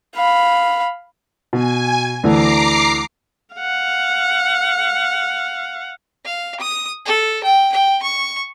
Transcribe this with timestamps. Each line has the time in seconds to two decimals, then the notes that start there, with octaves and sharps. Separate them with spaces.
0.15 F5 B5
1.53 B2 G#5
2.23 D2 E3 A3 A#5 D6 C7
3.55 F5 F#5
6.25 F5
6.60 D#6
7.06 A4
7.44 G5
7.73 G5
8.02 C#6